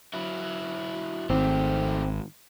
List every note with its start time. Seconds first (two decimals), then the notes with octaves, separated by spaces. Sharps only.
0.14 F#3 E4
1.30 G#1 A3 C4 G4